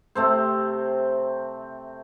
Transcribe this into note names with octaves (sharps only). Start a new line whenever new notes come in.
C3 A3 C4 C5